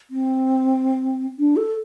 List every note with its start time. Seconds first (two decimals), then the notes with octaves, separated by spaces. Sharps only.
0.10 C4
1.39 D4
1.57 A4